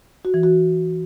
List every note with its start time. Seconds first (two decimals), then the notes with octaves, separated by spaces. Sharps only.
0.25 F#4
0.34 E3
0.43 F#4